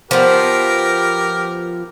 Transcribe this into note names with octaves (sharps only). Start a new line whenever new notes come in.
F3 B3 G4 A#4